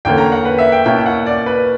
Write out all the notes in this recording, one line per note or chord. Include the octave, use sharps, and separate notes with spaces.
E2 D3 A#3 C#4 G5
A#5
F#5
B4
E5
G5
B2 A#3 C#4 E4 G5
F#5
D5
B4